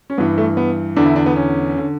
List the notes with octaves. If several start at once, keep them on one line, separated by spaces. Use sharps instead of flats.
C#4
G2 E3 B3
A3
B3
E2 D3 D4
E4
D4
B3
C#4
D3